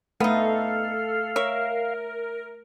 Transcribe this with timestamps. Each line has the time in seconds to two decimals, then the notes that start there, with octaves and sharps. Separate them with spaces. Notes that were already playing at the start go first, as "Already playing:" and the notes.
0.20 A3 B3 D#4 A4 F5
1.36 A#4 C#5 E5